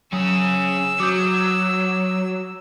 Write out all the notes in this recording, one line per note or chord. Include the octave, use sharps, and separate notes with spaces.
F#3 C#4 G#4 E6
F#3 D6 D#6 G6